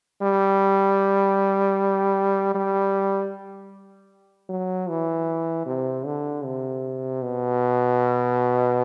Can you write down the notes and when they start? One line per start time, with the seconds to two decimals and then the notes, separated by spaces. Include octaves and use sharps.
0.22 G3
2.55 G3
4.49 F#3
4.89 E3
5.66 C3
6.06 D3
6.44 C3
7.22 B2